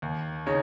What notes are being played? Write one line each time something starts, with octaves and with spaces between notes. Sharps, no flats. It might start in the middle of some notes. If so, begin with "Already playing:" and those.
D#2
C#3 D#4 C#5